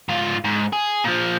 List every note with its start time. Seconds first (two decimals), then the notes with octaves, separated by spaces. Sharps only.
0.09 G#2 F4
0.44 G#2
0.73 G#4
1.04 A#2 F3